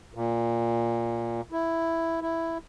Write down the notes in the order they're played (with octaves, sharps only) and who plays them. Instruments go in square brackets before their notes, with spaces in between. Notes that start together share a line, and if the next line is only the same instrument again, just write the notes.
[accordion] A#2
E4
E4